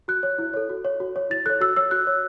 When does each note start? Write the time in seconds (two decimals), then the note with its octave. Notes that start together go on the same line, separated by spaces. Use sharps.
0.08 F#4 F#6
0.23 C#5
0.38 E4
0.54 A4 C#5
0.69 F#4
0.85 C#5
1.00 F#4
1.16 C#5
1.30 E4 A6
1.46 A4 C#5 F#6
1.61 F#4 E6
1.76 C#5 E6
1.91 F#4 F#6
2.07 C#5